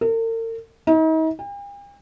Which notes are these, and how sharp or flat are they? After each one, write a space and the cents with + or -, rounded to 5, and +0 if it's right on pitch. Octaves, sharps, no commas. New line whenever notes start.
A#4 -45
D#4 +40
G5 +45